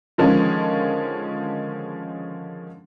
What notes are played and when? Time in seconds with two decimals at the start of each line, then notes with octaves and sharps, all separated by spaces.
0.18 D3 D#3 F3 G#3 C#4